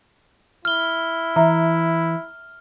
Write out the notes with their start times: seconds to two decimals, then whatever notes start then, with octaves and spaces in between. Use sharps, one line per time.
0.65 E4 F6 G7
1.36 E3 E5 A#5